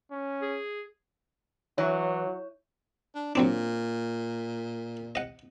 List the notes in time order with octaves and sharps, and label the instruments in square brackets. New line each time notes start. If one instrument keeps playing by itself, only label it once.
[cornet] C#4
[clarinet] G#4
[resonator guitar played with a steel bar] E3 [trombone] F#3 [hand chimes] C#5
[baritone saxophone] D4
[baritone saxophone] A#2 [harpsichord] F#3 C4 D4
[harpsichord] D#5 F#5